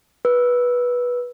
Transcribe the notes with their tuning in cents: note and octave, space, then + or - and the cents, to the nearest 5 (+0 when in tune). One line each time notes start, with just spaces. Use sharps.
B4 -15 E6 +0